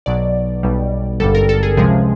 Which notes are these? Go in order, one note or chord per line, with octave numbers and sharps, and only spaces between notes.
B1 B2 F#3 D5
B1 B2 G3
G#1 G2 D3 G3 A4
A#4
A4
G#4
C#2 C3 F3 G#3 G#4